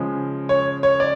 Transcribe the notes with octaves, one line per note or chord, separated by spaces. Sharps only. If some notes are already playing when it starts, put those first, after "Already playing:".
Already playing: C#3 F3 G#3
C#5
C#5
D5